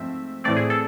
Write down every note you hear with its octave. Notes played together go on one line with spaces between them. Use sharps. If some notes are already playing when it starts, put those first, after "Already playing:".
Already playing: G#2 F3 A3 C4 E5
A2 E3 A3 C4 D5
G#4
A4